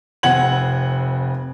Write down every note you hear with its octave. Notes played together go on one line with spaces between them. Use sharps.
F1 F2 C4 F#5 G#6 F#7